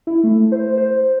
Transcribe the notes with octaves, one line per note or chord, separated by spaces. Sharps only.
E4
A3
C5
C5